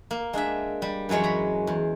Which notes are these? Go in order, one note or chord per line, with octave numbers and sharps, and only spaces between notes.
A#3
G#3 D4 G#4 E5
G3
F#2 E3 F#3 G#3 C#5
A#5 B5
E2